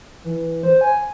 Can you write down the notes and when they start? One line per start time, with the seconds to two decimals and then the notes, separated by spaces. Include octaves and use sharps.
0.24 E3
0.63 C5
0.81 G#5